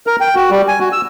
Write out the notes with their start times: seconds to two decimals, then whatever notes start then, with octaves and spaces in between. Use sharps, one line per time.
0.07 A#4
0.21 G5
0.35 F#4
0.51 G3
0.68 G#5
0.80 F#4
0.92 E6